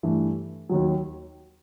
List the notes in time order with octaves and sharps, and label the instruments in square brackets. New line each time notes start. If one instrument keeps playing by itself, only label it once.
[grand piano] G2 E3 A3
D#2 D#3 F#3